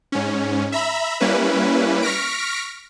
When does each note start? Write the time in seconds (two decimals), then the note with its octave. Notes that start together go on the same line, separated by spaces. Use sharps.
0.12 G#2 C#4
0.72 E5 A#5 B5
1.20 G3 A#3 C#4 E4 B4
2.02 C#6 F6 A#6 B6 D7